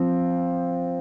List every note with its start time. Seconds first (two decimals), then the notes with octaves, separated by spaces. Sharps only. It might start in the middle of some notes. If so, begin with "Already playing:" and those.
Already playing: F3 C4